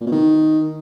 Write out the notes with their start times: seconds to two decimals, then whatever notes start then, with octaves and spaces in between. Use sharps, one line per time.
0.01 A#2
0.06 B2
0.12 D#3